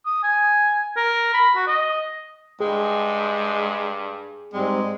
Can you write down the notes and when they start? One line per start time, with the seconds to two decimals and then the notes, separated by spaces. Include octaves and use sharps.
0.06 D#6
0.23 G#5
0.97 A#4
1.34 B5
1.56 F#4
1.67 D#5
2.60 G2 G#3 G#4 G5
4.53 G#2 G3 G#3 C4